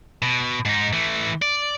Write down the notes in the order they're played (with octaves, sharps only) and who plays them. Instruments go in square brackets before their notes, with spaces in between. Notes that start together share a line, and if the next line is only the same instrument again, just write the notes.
[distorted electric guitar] B2
G#2 D#4
E3 A3
D5